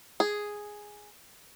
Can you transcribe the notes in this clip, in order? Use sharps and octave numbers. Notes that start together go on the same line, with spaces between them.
G#4